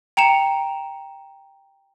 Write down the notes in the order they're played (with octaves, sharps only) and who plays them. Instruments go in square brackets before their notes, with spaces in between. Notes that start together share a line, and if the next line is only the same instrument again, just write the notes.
[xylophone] G5 A#5 C#7 E7